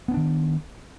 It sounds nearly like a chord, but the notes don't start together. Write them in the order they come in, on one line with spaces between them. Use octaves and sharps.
B3 C#4 D4 D#3